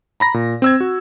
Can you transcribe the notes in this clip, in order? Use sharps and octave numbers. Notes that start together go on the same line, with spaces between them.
A#5 B5 A#6
A#2
C4 E6 G#6
F#4